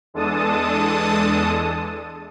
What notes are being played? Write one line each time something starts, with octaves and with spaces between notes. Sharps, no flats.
E2 G#3 D4 A4 A5 D#6